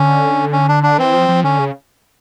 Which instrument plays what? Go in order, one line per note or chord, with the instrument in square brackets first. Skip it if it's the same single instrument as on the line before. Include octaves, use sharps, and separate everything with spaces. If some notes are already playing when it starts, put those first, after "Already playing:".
Already playing: [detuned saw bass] D3 [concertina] C#4
[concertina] C#4
D4
D4
[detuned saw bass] E3 [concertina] C4
[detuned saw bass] F3
F3
[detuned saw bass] D3 [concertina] C#4
[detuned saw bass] C#3